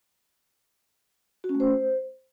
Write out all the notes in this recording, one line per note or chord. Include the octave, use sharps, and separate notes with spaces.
F#4
C#4
A3
C5